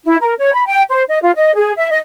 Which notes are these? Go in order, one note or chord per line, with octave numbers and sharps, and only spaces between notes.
E4
A#4
C#5
B5
G5
C5
D#5
F4
D#5
G#4
E5
D#5